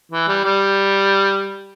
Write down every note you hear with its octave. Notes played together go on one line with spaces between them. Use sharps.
E3
G3
G3